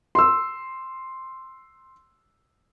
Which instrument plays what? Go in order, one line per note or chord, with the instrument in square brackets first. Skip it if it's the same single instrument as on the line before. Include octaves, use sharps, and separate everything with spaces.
[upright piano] C6 E6